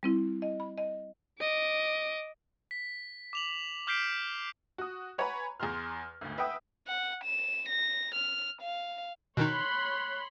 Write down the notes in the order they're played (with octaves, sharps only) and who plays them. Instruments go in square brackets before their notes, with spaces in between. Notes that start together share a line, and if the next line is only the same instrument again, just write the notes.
[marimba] G3 C4 E4
D#5
B5
D#5
[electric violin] D#5 D6
[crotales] B6
D6 F7 F#7
D6 F6 G6 B6 C7 D7
[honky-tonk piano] F#4 D#6
B4 C#5 F#5 G#5 A#5 B5
E2 G#4 A#5 C6 F6
G#1 D2
B4 E5 F#5 G5 D#6
[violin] F#5
E7
A#6
F6
F5
[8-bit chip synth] B2 D#3 D#4 [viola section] C#5 B5 C6 [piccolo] F#6